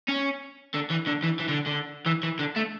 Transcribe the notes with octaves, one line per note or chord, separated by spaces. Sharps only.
C#4
D3
E3
D3
E3
E3
D3
D3
E3
E3
D3
A3